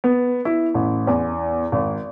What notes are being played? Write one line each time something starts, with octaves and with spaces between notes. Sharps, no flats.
B3
E4
A1
E2
G#1